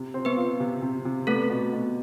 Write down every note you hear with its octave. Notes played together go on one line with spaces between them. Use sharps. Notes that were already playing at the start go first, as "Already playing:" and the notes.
Already playing: C3
C4
B3 B4
F4
C3
C3
C3
A3 B3 A4
B2
B2